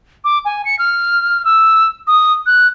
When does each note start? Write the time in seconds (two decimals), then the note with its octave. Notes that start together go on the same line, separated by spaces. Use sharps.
0.24 D6
0.45 G#5
0.65 C#7
0.79 F6
1.45 E6
2.07 D#6
2.46 F#6